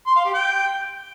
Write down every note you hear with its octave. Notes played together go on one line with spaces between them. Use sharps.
C6
F5
G4
G5